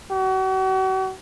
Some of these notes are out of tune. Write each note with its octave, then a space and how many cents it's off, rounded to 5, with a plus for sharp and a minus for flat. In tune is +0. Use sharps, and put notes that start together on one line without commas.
F#4 +40